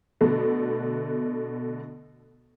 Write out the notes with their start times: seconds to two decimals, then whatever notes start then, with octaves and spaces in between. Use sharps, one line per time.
0.21 B2 D3 A3 B3